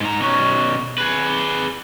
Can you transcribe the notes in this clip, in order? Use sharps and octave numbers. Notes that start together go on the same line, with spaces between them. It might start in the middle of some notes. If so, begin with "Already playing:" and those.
G#2 A#5
B2 C#4
G#4 B4